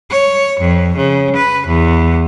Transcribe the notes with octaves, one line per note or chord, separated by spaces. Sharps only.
C#5
F2
C#3
B4
E2